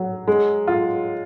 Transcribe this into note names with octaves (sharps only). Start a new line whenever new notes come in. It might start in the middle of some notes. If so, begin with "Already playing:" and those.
Already playing: F#3
G#3
F4